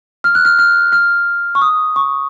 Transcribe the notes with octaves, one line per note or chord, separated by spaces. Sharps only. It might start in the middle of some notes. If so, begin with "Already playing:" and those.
F6
F#6
F6
F6
F6
C#6
D#6
C#6